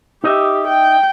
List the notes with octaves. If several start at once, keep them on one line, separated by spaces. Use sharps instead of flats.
D#4 G4 D#5 E5
G5